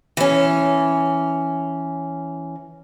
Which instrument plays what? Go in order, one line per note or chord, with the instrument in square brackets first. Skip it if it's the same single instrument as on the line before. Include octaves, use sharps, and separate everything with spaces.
[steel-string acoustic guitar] E3 C#4